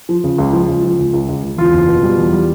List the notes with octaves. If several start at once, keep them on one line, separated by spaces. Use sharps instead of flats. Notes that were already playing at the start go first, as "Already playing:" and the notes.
F3
C#3
C#2
F3
C#2
F3
C#2
C#2
C#2
C#2
E2 F4
F#1
B2
G3
E2
G3